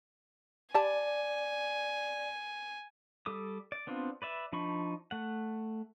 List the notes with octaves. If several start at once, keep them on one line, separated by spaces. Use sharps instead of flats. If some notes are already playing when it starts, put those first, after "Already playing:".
G4 D5 G#5 A5 B5
G3 A4 D6 D#6
D5
B3 C4 D4 F4
B4 D5 E5
F3 D4 D#4 B5 C#6
A3 F#5